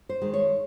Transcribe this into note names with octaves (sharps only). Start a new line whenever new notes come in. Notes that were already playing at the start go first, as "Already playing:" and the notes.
C5
D#3 G#3
C#5